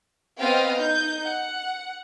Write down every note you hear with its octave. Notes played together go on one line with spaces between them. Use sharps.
B3 C4 D#5 F5 G5
D#4 G6
F#5